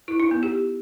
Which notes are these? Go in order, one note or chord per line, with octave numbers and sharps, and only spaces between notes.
E4
D#4
B3
G4